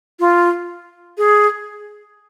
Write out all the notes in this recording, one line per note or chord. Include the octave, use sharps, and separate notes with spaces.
F4
G#4